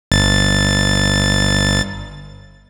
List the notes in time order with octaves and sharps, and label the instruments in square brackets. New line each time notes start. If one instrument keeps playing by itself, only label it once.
[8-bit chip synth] G1 A6